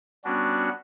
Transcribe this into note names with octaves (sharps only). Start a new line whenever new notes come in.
G3 B3 C#4 D4 F#4